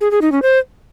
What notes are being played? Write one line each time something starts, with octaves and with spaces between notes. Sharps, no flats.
G#4
G#4
D#4
C#4
C5